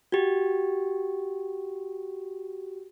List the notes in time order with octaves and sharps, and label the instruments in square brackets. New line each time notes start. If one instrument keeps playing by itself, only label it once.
[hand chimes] F#4 G4